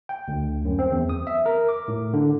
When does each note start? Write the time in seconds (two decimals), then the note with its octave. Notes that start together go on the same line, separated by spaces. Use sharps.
0.09 G5
0.28 D2
0.65 F#2
0.79 C4
0.91 E2
1.09 D#6
1.27 E5
1.46 A#4
1.68 D6
1.88 A2
2.13 D3